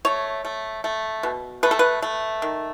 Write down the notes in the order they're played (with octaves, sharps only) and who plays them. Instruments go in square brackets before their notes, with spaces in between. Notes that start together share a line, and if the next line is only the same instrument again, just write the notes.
[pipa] A3 C#5
A3
A3
B2
A3 B4
A4
B4
A3
D#3